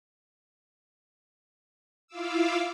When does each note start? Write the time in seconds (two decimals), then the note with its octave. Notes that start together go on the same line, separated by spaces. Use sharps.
2.07 E4 F4 F5 D6 E6